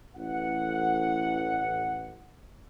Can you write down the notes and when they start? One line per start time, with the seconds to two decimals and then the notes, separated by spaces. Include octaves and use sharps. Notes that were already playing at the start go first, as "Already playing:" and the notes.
0.16 A1 F#5